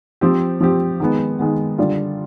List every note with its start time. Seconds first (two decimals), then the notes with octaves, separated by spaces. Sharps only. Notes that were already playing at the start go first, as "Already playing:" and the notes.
0.21 F3 C4 G4
0.60 F3 C4 G4
1.00 D#3 G#3 B3
1.39 D#3 G#3 B3
1.78 D3 G3 D4 F4